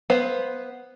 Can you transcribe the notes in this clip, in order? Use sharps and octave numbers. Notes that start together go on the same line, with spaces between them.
B3 B4 C5 F5